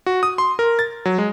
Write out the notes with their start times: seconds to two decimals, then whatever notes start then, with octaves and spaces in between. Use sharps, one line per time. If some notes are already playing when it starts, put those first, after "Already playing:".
0.06 F#4
0.23 D#6
0.38 C6
0.59 A#4
0.79 A6
1.05 F#3
1.18 G#3